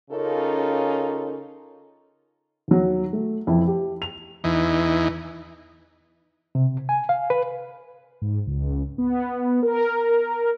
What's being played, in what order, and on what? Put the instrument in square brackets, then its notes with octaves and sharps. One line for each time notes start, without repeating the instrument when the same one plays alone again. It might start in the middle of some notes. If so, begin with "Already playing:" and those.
[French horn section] C#3 C#4 D#4 F4 A4 A#4
[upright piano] D#2 F#3
A3
F2 E3 E4
G4
F7
[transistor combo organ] E2 E3 D#4
[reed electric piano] C3
G#5
F5
B4
[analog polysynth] G#2
C#2
B3
A#4